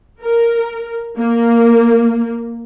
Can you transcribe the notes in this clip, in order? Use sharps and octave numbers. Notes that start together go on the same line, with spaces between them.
A#4
A#3